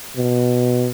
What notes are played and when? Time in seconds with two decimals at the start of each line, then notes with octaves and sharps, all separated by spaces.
0.17 B2